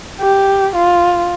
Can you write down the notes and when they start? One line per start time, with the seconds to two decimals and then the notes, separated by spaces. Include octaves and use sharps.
0.22 G4
0.76 F4